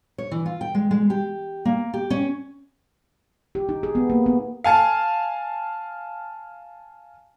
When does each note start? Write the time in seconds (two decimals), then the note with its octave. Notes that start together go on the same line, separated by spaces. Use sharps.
0.18 C#5
0.31 E3
0.46 F4
0.61 G5
0.75 G#3
0.91 G#3
1.10 G4
1.65 A#3
1.94 G4
2.10 C#4
3.55 G4
3.69 D#4
3.83 G#4
3.95 B3
4.10 A#3
4.26 B3
4.64 F5 G#5 A5